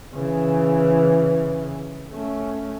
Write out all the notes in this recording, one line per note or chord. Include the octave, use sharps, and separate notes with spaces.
C#3 E3
A3 C#4